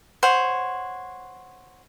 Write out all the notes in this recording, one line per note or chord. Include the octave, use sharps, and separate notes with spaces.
C5 C#5 F#5